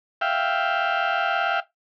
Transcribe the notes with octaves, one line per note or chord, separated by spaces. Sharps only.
E5 F5 G5